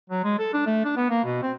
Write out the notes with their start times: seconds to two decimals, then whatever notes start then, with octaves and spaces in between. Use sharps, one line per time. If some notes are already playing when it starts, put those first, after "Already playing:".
0.10 F#3
0.24 G#3
0.39 A4
0.53 D4
0.66 A3
0.84 D4
0.97 B3
1.10 A#3
1.24 B2
1.42 C4